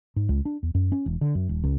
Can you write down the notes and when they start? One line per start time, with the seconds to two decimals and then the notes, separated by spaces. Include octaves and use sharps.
0.16 G#2
0.29 C#2
0.45 D4
0.63 E2
0.75 F#2
0.92 C#4
1.06 E1
1.21 D3
1.35 F#2
1.49 D#1
1.64 C#2